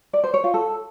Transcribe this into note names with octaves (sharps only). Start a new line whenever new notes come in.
D5
C5
C#5
F4
A4